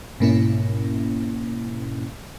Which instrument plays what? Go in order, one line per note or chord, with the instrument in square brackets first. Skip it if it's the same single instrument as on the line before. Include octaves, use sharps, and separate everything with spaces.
[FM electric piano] G#2 B2 A#3 C#4 E4